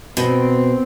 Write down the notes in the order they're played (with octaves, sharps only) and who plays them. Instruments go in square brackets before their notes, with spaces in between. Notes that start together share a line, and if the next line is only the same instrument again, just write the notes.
[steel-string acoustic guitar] B2 [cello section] C4